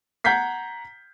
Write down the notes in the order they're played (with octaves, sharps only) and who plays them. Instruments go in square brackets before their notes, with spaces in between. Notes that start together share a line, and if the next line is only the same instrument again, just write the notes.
[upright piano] F#5 A#5 G6 G#6 B6 C7